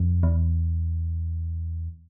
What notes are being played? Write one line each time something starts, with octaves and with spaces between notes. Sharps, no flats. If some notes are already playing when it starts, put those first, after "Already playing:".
Already playing: F2
E2